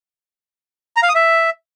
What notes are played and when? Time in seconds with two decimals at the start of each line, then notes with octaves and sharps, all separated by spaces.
0.96 A#5
1.03 F5
1.09 D#6
1.15 E5